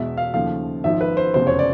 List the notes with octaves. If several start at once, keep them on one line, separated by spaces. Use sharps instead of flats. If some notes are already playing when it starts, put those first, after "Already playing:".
Already playing: E2 B2 G#3 E5
F5
D#2 C#3 F3 A3 F5
G#1 G#2 F3 E5
B4
C5
F1 E2 C#3 C5
C#5
D5